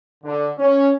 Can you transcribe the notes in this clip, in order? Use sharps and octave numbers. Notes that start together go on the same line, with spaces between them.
D3
C#4